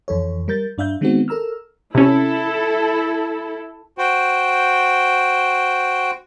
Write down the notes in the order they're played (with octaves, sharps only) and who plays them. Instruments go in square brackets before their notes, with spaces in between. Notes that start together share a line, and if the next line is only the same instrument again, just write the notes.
[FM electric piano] F2 E3 A4 C#5
G3 A#4 G6 A6
G2 D4 E5 F5 G6
D#3 G#3 B3 C4 D#4 F#4
A4 A#4 A#5 E6 F6
[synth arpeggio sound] C3 C#4 [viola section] E4 A4
[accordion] F#4 C5 G5